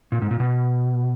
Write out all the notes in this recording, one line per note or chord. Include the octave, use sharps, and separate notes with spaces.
A#2
G#2
A#2
B2